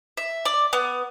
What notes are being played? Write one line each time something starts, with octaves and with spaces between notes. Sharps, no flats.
E5
D5
B3